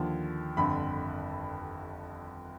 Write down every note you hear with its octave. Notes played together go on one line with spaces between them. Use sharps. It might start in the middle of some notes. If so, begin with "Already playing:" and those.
Already playing: D#2 D3 F3
G1 F2 D3 B5